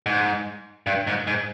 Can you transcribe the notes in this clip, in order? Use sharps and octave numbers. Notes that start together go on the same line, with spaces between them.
G#2
G2
G#2
G#2